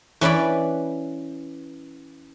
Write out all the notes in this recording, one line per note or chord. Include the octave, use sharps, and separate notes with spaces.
E3 C#4 B4 D5